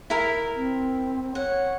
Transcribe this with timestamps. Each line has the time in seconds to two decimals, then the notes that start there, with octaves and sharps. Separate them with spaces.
0.10 E4 A#4
0.56 C4
1.35 C#5 F#5